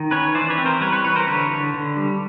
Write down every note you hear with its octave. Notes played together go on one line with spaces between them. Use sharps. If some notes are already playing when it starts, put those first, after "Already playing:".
Already playing: D#3
C#4 B4 C#5
E3 C5 D5
B4 C#5
C4
A#4 C5
G3 B4 C#5
B4 C#5
E3 B4 C#5
A#4 C5
D3 B4 C#5
D3
D3
G3